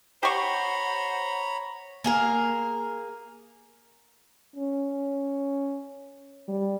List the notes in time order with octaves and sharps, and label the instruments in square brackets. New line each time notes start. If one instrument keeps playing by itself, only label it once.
[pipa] G4 C#6 [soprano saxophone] C5 [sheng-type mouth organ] C#5 A#5 B5 [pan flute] F#5
[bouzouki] A#3 G#4 A#4
[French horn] C#4
G3